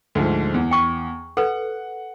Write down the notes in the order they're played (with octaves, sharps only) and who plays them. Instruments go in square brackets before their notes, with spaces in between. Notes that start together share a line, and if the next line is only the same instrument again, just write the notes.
[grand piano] D2 G#2 F3
E2
[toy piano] G5 C#6
[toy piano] A4 B4 [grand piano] F#5